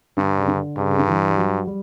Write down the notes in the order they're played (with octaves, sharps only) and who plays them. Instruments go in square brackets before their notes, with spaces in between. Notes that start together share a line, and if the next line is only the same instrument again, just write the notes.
[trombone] G2 [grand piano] D3
[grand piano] C#3
D3
[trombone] G2 [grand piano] C#3
[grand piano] C#3
D3
E3
G3
F#3
G3